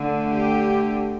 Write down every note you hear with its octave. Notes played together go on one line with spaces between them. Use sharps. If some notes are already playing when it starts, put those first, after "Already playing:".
Already playing: D3 A3
G4